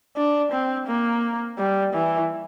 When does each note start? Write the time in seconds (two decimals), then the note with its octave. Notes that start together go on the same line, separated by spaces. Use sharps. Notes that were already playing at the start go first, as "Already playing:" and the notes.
0.17 D4
0.52 C4
0.87 A#3
1.58 G3
1.93 E3